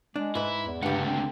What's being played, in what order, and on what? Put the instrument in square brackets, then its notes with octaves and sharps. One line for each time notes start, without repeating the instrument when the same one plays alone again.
[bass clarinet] G#3 [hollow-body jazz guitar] D4
[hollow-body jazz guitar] G#2 B4 [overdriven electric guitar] E4
[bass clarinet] E2
[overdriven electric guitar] C#2 D3 [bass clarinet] G2 [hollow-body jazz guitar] G4 F#5
[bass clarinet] C4